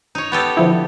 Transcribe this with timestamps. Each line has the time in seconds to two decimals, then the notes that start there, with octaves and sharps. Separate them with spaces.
0.15 D#4 C#5
0.32 B3 G4 A4
0.57 D3 F3 E4